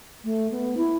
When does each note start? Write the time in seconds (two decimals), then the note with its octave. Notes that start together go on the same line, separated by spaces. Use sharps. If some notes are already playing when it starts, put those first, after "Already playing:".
0.24 A3
0.51 B3
0.77 E4